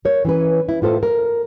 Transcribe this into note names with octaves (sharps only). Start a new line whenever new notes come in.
A#4 C#5
E3 C#4 B4
E4
A2 F4 A4 C5
A#4